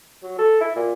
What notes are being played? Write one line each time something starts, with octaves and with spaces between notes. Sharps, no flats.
F#3
A4
E4
A#2